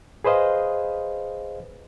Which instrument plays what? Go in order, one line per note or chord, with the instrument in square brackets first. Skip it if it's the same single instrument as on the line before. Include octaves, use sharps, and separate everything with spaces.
[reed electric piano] G#4 B4 C5 D#5 F5